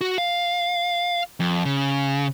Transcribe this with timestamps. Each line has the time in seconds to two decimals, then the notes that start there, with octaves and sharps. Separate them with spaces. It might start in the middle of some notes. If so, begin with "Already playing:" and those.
0.01 F#4
0.18 F5
1.40 F2
1.65 C#3